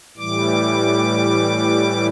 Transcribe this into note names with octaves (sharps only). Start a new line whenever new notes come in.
A2 E3 G3 D6